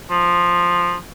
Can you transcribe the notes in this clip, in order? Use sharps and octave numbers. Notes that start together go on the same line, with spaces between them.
F3